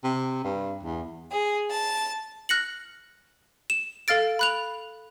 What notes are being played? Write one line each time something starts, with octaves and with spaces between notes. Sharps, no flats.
C3
G2
E2
G#4
A5
F6 F#6 A#6 C#7 F#7
E7
A4 F5 F6 A6 D7
B5 F#6 F7